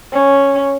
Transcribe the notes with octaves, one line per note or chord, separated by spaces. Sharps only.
C#4